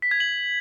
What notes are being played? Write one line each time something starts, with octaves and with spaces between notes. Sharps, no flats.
B6
G#6
F#7